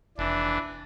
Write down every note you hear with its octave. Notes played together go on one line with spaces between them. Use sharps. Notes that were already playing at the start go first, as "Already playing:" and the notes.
F1 E3 D4